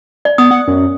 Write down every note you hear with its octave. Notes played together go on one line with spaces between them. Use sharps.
D5
B3 D#6
F#5
F#2